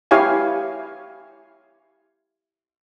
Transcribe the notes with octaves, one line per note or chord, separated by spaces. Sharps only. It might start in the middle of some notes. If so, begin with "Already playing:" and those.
E4 G4 C#5 F5 G#5